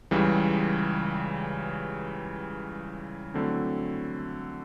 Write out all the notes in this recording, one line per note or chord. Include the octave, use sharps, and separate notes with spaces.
C#2 C#3 E3 G3
D3 F#3 A3 C4 E4